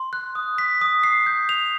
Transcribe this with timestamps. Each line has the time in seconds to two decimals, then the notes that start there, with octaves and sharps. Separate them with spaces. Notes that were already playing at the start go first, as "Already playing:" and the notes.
Already playing: C6
0.13 F#6
0.35 D#6
0.58 B6
0.81 D#6
1.04 C7
1.26 G6
1.49 F7